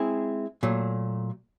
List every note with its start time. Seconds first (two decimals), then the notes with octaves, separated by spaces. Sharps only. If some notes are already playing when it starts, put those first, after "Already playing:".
Already playing: G#3 C4 E4 G#4
0.63 A#2 F#3 A3